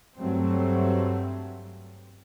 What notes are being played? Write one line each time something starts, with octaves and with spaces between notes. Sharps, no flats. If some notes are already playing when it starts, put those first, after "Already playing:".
G2 F#3 A3 C4